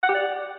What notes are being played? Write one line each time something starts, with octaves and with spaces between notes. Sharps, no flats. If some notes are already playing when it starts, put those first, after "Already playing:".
F#5
G4
D5